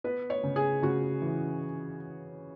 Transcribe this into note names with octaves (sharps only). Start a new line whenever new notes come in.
B3 B4
C#5
C#3
G#4
C#3 F#4
E3